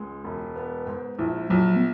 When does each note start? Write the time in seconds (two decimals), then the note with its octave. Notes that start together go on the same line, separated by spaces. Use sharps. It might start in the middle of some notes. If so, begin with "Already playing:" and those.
Already playing: C#2 G#3
0.24 E1
0.56 B3
0.87 G#2
1.19 A#1 E4
1.50 A#1 F#3
1.76 B3